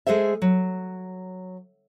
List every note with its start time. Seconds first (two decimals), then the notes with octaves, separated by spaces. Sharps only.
0.07 G#3 G#4 A4 C5 E5
0.42 F#3